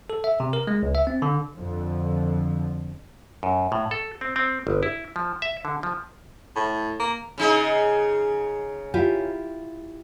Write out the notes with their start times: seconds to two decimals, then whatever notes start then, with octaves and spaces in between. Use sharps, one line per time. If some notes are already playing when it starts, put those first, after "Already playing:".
0.10 A4
0.24 E5
0.40 C3
0.53 A#4
0.67 G#3
0.83 C#2
0.95 E5
1.07 C4
1.22 D3
1.55 F2 D3 F3
3.43 F#2
3.72 A2
3.91 A4
4.21 C4
4.36 C4
4.67 G1
4.83 E4
5.16 F3
5.42 E5
5.65 D3
5.83 F3
6.56 A2
6.99 A#3
7.38 C#3 D#4 G#4
8.94 E4 F4 G4